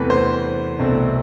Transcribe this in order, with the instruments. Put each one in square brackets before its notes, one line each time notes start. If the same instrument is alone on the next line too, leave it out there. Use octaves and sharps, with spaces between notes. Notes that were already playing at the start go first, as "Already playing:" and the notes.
Already playing: [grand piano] E2 C3 E3 A3 B4
C5
C2 B2 A3 C4